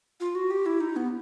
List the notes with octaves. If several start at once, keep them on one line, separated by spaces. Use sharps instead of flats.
F4
F#4
G4
E4
D#4
B3